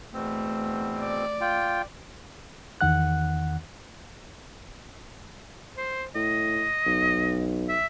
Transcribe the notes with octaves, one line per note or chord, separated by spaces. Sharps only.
E2 B2 A3 C4
D5
F4 G5
E2 D#3 F#5 F#6
C5
A2 D#5
B1
E5